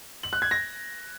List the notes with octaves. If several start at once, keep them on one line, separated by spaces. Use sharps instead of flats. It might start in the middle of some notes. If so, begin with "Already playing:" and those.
F#7
F#6
G#6
A#6